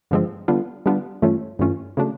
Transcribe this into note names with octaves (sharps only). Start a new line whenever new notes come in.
G2 D3 F3 G#3 C4
D3 G3 B3 D4 F4
D3 G3 B3 D4 F4
G2 E3 A3 C#4 F4
G2 E3 A3 C#4 F4
C#3 F#3 A3 D4